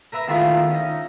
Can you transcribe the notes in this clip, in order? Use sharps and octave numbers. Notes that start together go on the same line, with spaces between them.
A#4 B4 E5 A#5
D#3 G#3 A3 B3 E4 F4
C#4 D#4